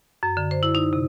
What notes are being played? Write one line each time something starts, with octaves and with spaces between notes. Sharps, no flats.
F#2
D3
C5
E4
D#4
C3